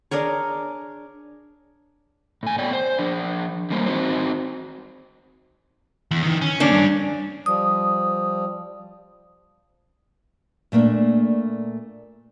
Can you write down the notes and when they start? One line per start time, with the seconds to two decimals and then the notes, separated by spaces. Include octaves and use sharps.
0.11 D4 G#4 A#4 C#5
2.43 A2 G#5
2.58 B3 C#5 D5 G5
2.73 C5
2.99 F3 D4
3.70 E2 G3 A#3 C5
3.86 C4 D#4 F#4 C5
6.11 E2
6.23 D#3 E3
6.41 C#4
6.60 D#3 A#3 C#4 D4
6.72 G2
7.46 F3 G3 D#6
10.72 A#2 A3 A#3 D4